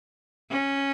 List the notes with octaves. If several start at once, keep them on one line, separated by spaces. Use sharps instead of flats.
C#4